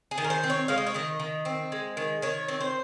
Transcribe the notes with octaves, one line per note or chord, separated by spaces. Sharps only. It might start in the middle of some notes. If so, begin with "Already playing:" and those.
G#4
D#3
A#4
C5
C4
C#5
G#3 F5
D#5
C#5
D#3 D#5
D#3
C4
G#3
D#3
D#3 C#5
C4
C5